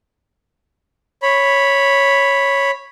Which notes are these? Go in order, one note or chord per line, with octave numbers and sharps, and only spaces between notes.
C#5 B5